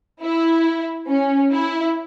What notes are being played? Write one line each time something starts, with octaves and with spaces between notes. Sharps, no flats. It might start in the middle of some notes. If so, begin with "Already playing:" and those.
E4
C#4
E4